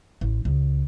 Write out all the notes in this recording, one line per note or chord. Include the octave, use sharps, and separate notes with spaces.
A1
C#2